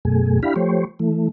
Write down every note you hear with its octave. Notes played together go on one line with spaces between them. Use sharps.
F#2 B2 A3 G#4
D4 E4 G4 F5 B5
F3 A3 G4 C5 C#5
E3 A3